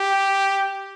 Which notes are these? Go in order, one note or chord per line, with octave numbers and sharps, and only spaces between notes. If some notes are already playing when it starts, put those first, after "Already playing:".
Already playing: G4